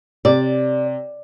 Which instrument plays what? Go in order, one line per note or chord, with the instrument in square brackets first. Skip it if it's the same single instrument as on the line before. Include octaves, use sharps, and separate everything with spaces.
[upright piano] C3 [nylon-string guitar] D5